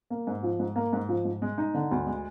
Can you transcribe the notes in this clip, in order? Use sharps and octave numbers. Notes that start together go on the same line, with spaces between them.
A#3
G#2
F3
G#2
A#3
G#2
F3
G#2
G#3
D#4
D3
D2
G#3